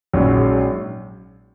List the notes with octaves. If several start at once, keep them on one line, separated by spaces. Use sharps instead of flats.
A#1 G#2 F#3 C#4